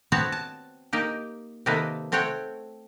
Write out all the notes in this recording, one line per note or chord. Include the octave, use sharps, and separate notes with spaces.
B3 C4 F#4 C#5 F#5 A5
A5
A#3 D#4 G4
C3 D#3 A#3 D#4 A4 B4
A3 C4 C#5 F#5 G5